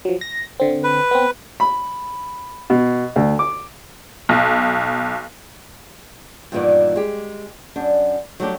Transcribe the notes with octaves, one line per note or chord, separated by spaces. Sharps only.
F3 F#3
A#6
D3 C4
B4
B3 C4
B5
B2
D2
D6
B1
G2 A#2 D#3 E3 B3 D5
G#3 G4
F#2 D4
F#3 G3 A3 D4 F#4 G4